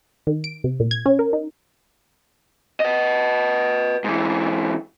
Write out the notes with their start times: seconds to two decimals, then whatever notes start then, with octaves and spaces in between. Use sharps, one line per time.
0.27 D#3
0.44 D7
0.64 C3
0.80 A#2
0.91 G#6
1.06 C#4
1.19 A#4
1.33 D#4
2.80 B4 D#5
4.04 G#2 E3